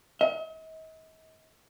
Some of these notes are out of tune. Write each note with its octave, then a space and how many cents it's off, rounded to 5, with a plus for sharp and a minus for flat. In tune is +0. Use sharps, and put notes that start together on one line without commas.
D#5 +45